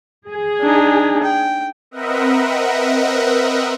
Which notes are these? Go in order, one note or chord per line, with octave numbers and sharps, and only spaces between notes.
G#4
D4 D#4
G5
C4 A#4 B4 D#5 E5 F#5